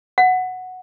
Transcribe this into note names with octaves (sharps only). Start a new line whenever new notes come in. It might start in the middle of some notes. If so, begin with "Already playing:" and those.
F#5